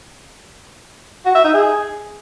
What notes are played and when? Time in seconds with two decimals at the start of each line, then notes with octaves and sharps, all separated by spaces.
1.26 F#4
1.35 E5
1.44 D#4
1.54 G#4